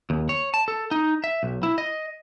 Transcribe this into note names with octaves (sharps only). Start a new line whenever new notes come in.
D#2
C#5
A5
A4
D#4
E5
B1
E4
D#5